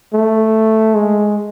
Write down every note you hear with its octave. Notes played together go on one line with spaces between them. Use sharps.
A3
G#3